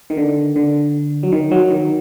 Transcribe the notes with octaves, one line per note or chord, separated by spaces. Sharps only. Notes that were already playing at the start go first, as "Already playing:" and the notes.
D#3
D3
D3
F#3
D#3
F#3
D#3